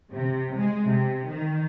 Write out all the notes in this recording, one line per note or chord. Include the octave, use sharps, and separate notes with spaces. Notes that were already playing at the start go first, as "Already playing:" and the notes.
C3
G#3
C3
D#3